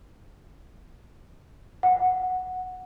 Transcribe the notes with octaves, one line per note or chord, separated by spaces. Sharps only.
F#5